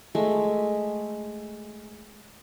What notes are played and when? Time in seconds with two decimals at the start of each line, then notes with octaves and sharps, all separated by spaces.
0.15 G#3 A3 E5